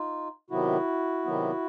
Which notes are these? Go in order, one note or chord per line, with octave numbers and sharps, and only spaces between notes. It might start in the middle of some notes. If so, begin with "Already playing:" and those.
Already playing: D#4 F4
C3 D#3 F#3 B3 E4 F#4
C3 D#3 F#3 B3